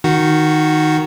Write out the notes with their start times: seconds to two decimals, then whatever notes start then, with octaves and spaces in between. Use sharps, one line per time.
0.04 D#3 F#4